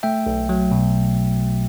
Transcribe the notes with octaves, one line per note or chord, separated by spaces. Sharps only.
A3 E5 G5
B1
F#3
B2